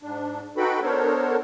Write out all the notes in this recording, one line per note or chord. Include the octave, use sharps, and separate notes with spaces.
G#2 D4
D#4 F#4 A4 B4 G5 B5
B3 D4 A4 A#4 C5 C#5